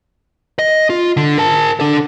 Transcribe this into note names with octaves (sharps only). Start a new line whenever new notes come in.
D#5
F4
D3
A#4 A5
D4 A4